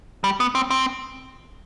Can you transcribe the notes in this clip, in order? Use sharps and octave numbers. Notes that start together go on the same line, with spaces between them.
G3
B3
C4
C4